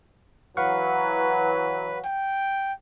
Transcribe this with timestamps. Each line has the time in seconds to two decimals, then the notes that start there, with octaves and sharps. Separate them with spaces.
0.57 E3 F#3 B4 F5 F#5 C#6
2.05 G5